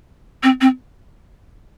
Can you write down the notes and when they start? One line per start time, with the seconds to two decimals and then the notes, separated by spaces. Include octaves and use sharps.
0.43 C4
0.61 C4